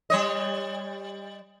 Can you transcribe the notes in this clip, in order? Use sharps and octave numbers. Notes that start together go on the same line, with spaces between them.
G3 C#5 D#5